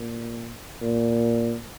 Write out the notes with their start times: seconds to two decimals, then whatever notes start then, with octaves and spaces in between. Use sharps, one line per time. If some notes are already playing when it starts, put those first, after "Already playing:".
Already playing: A#2
0.81 A#2